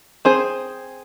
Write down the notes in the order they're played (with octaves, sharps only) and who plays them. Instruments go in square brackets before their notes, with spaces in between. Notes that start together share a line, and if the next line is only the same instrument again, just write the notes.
[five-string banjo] C4 G#4 C5